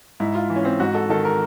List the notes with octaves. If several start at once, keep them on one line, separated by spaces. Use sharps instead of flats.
G#2 E4
F4
E3
C#4
C4
G#2 F#4
A4
D#3 A4
A#4